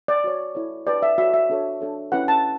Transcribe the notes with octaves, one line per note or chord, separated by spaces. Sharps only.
D5
F#4 C#5
E4 A4 C#5
D4 G4 B4 D5
E5
F#4 A4 C#5 E5
E5
D4 F#4 A4 C#5
D4 A4 C#5
C#4 E4 G4 B4 F#5
A5